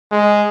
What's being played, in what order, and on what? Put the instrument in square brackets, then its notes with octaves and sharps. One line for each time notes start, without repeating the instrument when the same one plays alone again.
[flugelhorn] G#3